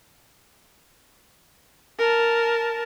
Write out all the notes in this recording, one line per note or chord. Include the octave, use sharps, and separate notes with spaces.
A#4 A5